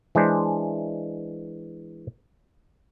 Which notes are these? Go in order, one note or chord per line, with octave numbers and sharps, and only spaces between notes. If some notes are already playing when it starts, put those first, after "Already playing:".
E3 G#3 D4 C5